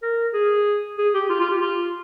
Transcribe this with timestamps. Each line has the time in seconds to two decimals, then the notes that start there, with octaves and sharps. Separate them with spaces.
0.02 A#4
0.34 G#4
0.98 G#4
1.14 G4
1.29 F4
1.40 F4
1.51 G4
1.61 F4